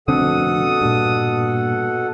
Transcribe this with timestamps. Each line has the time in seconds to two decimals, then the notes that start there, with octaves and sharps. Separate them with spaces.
0.08 F1 B2 D3 C4 A4 F#5 D#6
0.82 G2 A#2